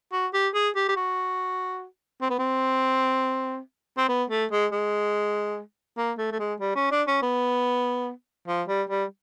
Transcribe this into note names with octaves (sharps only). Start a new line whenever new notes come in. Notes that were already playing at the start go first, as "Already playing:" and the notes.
F#4
G4
G#4
G4
G4
F#4
C4
B3
C4
C4
B3
A3
G#3
G#3
A#3
A3
A3
G#3
G3
C#4
D4
C#4
B3
F3
G3
G3